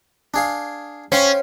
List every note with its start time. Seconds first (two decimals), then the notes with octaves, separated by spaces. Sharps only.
0.34 D4 G#4 F5
1.12 C#4 C5 F5 G5